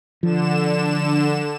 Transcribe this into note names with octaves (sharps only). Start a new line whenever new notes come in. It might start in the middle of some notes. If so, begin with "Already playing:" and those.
D3 F3 E7